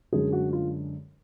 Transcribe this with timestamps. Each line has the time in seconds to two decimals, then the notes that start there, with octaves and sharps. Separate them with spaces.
0.12 F#2 D3 G#3 G#4
0.33 F#4
0.53 F4